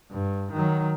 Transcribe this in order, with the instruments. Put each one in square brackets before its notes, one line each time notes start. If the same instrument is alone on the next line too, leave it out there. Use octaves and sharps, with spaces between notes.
[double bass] G2
D#3 F#3